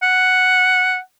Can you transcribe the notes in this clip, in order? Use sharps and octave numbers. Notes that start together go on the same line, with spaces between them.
F#5